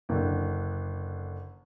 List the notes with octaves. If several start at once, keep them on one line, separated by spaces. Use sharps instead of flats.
F#1 D3